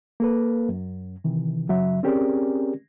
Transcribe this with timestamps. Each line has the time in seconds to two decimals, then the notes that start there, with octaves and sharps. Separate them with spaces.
0.20 A#3 A4 B4
0.69 F#2
1.24 C3 D#3 E3
1.68 F#2 C#3 F#3 E5
2.03 C4 C#4 G4 G#4 A#4 D5